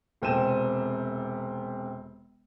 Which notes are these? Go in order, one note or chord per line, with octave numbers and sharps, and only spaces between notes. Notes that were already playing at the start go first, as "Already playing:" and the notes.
E1 C3 C4 A4 D#7 E7